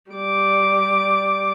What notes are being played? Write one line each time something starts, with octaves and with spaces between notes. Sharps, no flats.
G3 D6